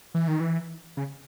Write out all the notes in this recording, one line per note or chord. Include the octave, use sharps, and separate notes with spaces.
E3
D#3
E3
C#3